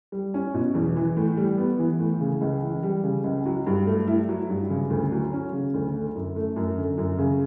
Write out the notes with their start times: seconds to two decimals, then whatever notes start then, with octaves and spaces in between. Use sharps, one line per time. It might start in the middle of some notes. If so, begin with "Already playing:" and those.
0.12 G3
0.34 C#4
0.54 B2
0.75 E2
0.97 E3
1.17 A2
1.37 G3
1.58 B3
1.79 E3
1.99 A2
2.21 C#3
2.41 C#2
2.63 E3
2.83 G3
3.04 C#3
3.24 C#2
3.46 F#3
3.67 G2
3.86 A3
4.07 E4
4.29 F#3
4.50 G2
4.70 C#3
4.90 D2
5.12 F#3
5.33 C#4
5.53 C#3
5.74 D2
5.94 D3
6.16 F#2
6.36 A3
6.56 F#2
6.78 D3
6.98 F#2
7.19 C#3